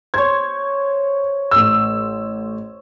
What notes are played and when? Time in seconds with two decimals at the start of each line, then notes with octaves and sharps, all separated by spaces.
0.14 C5 C#5 G#6
1.51 A1 E6